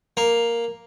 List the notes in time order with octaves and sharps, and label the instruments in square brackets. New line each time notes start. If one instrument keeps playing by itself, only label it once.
[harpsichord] A#3